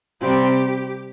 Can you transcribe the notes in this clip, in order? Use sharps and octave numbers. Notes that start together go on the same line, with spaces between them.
C3 G3 C4 G4